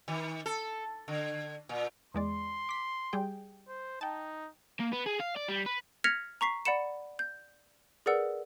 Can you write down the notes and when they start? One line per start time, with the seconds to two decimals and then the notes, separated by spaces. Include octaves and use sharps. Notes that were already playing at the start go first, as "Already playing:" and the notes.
0.08 D#3
0.46 A4
1.08 D3
1.69 A#2
2.14 E2 G#3 D5 C6
2.69 D6 B6
3.13 G3 G#4 G5
3.68 C5
4.01 D#4 G5 A5
4.80 A#3
4.93 B3
5.07 G#4
5.20 F5
5.37 D5
5.49 G3
5.66 B4
6.04 F6 G#6 A#6 B6 C#7 F7
6.41 A#5 C#6 B6 C7
6.65 D5 F#5 B5 C#7 E7
7.19 G6
8.06 G#4 A#4 B4 D5 F#5 E6